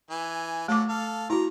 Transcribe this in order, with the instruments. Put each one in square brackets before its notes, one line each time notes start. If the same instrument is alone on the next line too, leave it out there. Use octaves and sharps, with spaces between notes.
[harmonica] E3 G#5
[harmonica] F#3 A4 [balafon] A3 D6
[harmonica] A4 F5
[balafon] E4 F#4 [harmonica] A#5